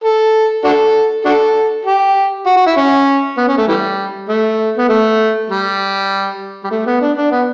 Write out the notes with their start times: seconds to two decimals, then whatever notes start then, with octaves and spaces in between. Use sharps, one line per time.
0.04 A4
0.64 D4 F#4 A4
1.25 D4 F#4 A4
1.85 G4
2.46 F#4
2.57 F#4
2.66 E4
2.77 C#4
3.37 B3
3.48 C#4
3.57 A3
3.68 E3 G3
4.28 A3
4.77 B3
4.89 A3
5.50 G3
6.64 G3
6.71 A3
6.86 B3
7.01 D4
7.17 D4
7.31 B3